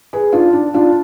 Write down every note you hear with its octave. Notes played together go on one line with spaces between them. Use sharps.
G#4 B4
D4 F4
D4
D4 F4